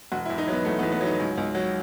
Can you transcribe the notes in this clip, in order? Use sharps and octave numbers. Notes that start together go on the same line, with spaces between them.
E1 F#4
E4
E2
D#4
F#3 B3
E2 A3
B3
E2
B3
F#3
D#4
C#2
C#2
F#3